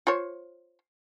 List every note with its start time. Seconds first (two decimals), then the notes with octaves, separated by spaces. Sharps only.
0.07 F4 C5 C#5